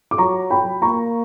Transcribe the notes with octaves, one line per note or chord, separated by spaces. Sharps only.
D6
F#3 A#5 C#6
G5 B5
A#3 A#5 C#6